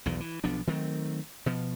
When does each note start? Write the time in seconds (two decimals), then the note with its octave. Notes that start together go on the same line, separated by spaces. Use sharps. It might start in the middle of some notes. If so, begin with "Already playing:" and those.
0.06 B1 E2 D#3
0.20 E3
0.44 B1 F3 B3 D4
0.67 D#3 F#3 A3 C4
1.46 B2 F3